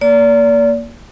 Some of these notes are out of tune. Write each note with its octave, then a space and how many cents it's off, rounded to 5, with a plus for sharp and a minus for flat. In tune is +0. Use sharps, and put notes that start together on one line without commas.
A#3 +0 D5 -35